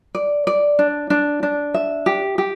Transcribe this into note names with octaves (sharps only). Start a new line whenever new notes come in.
D5
D5
D4
D4
D4
E5
G4
G4